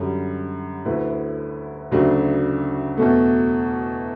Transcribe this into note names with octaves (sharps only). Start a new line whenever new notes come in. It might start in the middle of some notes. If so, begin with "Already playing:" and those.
Already playing: F#2 D3 G3
D2 D3 A3 E4 B4
D2 C#3 F#3 A3 D4
E2 B2 A3